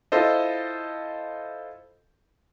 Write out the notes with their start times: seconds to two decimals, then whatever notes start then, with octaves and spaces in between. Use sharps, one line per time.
0.12 E4 F4 A4 C5 D#5